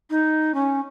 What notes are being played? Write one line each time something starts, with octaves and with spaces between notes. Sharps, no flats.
D#4
C#4